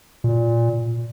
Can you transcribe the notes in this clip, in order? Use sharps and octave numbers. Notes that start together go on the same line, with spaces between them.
A#2